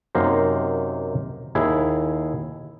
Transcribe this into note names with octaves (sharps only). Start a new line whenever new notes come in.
F#2 C3 A#3 D#4 C5
D#2 E4 G#4